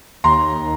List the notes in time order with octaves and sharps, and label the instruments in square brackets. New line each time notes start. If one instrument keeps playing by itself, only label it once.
[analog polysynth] D#2 [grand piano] A#5 C6